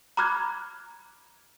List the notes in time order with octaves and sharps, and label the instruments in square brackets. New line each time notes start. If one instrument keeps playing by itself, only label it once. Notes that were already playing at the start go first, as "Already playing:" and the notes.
[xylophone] A#5 B5 D6 F6 F#6 G#6